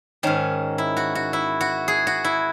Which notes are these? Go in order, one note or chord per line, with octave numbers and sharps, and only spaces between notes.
G#2 D#3 C#4
E4
F#4
F#4
E4
F#4
G#4
F#4
E4